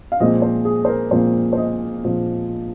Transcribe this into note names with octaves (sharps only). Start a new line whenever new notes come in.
F5
A#2 F3 G#3 C4 D#5
C5
G#4
C5
A#4
A#2 F3 G#3 C4 C5
C5
D#5
A#2 F3 G#3 C4